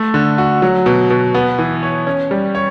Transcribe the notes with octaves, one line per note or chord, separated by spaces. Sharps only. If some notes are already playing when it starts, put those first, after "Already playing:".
Already playing: A3
D3
F#4
F#3
B2
B2
B3
E3
C#5
C#4
G3
C#5